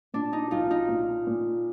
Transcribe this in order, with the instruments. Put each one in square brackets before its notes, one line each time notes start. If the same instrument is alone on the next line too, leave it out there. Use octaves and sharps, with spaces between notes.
[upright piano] A#2 [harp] D4
[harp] D#4
[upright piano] B1 [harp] D#4 F4
[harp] D#4
[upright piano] A#2
A#2